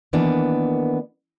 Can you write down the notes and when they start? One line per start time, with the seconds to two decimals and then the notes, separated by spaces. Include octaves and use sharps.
0.13 D#3 E3 A#3 B3 D4